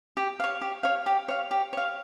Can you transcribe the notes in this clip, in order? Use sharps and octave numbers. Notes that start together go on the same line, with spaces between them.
G4
C#5 F5
G4
C#5 F5
G4
C#5 F5
G4
C#5 F5